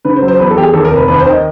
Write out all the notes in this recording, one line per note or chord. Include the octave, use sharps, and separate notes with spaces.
C#3 B4
C5
F#3
C5
E2 B4
A4
E2 G4
G#4
D#2 A4
A#4
F1 B4
D#2 B4
C5
D#3
D#5